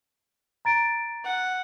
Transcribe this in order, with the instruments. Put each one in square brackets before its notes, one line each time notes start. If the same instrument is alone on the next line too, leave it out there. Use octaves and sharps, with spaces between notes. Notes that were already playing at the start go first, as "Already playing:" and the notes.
[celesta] A#5 A6 D7
[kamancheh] F#5